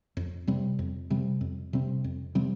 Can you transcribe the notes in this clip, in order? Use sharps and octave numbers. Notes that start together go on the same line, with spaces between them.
F2
C3 G3 C4
F2
C3 G3 C4
F2
C3 G3 C4
F2
C3 G3 C4